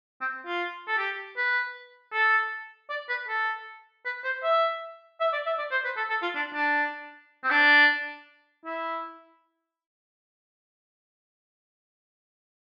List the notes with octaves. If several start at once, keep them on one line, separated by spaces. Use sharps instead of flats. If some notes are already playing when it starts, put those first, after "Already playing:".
C4
F4
A4
G4
B4
A4
D5
B4
A4
B4
C5
E5
E5
D5
E5
D5
C5
B4
A4
A4
F4
D4
D4
C4
D4
E4